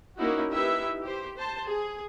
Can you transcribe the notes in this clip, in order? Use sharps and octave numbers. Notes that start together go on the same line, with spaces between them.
A#3 C#4 D#4 E4 F#4
D#4 E4 G4 B4 E5
G4 C5
C5 A5
G#4